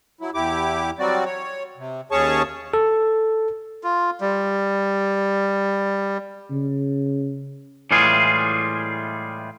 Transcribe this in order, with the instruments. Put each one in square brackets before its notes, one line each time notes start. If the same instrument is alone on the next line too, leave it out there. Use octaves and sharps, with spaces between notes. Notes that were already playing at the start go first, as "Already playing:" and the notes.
[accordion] F#3 E4
E2 E4 G4 D6
F#3 G3 C4 F#4 D5
C#5
C3
D#2 C#4 G#4 C#5 A5 C#6
[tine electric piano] A4
[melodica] F4
G3
[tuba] C#3
[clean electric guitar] A2 E3 G3 G#3 F4 G#4